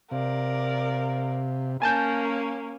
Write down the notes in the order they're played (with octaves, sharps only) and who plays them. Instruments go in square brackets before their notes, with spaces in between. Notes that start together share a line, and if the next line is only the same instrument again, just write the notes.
[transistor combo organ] C3 [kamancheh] A#4 D5 [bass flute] F5
[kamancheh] A#3 C#4 [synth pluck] G#5 A5 G6